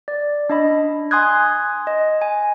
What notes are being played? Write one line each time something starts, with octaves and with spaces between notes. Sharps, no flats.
D5
D4 D#5 B5
G#5 C6 D#6 F#6 G#6
D#5
G#5